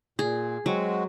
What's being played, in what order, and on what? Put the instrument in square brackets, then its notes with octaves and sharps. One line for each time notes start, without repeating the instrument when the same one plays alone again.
[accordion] A#2 [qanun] G#4
[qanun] F#3 [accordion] G#3 C4 F#4